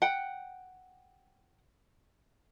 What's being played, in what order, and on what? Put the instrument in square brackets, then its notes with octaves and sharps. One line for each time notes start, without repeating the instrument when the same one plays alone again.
[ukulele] F#5 G5